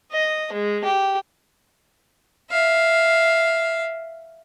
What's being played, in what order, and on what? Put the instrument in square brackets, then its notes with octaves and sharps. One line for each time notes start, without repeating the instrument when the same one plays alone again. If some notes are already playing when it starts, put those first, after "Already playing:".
[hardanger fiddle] D#5
G#3
G4
E5 F5